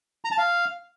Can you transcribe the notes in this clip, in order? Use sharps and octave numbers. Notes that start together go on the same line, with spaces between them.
A#5
A5
F5